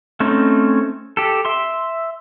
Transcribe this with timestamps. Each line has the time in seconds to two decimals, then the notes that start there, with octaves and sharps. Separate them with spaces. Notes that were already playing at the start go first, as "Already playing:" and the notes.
0.20 A3 C4 C#4 D#4
1.17 G4 A4
1.45 E5 C6